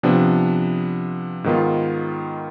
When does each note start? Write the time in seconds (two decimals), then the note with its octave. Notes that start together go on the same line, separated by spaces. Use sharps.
0.03 C3 F3 B3 D4
1.44 G#2 D#3 B3 F4